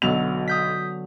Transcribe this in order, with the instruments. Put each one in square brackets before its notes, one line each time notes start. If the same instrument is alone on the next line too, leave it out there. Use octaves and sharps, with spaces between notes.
[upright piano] B1 F7 [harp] D3 F#3 B3
[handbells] D#6 G6 B6